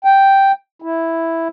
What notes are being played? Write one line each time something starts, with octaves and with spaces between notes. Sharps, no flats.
G5
E4